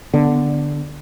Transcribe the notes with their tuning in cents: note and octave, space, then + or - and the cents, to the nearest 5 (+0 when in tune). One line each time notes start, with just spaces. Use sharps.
D3 +0 B3 +0